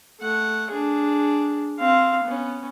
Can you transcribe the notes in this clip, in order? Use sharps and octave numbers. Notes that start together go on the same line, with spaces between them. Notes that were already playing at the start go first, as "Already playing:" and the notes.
A3 F#5
D4 G#4
C4 F5
B3 C#4